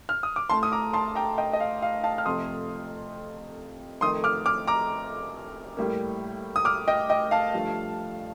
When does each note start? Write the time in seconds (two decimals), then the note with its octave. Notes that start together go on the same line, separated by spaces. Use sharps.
0.09 F6
0.23 D#6
0.36 D6
0.50 A2 A3 A5 C6
0.63 D#6
0.72 A#5 D6
0.93 A5 C6
1.15 G5 A#5
1.38 D#5 G5
1.53 D#5
1.60 F5
1.82 F5
2.04 F5 A5
2.18 F6
2.25 F2 C3 F3 A3 C6 D#6
4.01 F2 D#3 A3 C6 D#6
4.24 D6 F6
4.46 D6 F6
4.68 A#5 D6
5.77 A2 G3 A#3
6.56 D#6
6.65 D6 F6
6.88 D#5 G5
7.09 D#5 G5
7.31 F5 A5
7.54 G2 F3 A3